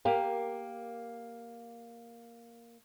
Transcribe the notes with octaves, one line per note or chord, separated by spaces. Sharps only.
A#3 G4 A#4 F5